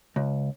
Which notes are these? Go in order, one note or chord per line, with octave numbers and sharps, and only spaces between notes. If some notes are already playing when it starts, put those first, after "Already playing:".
C#2